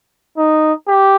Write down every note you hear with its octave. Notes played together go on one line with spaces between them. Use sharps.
D#4
G4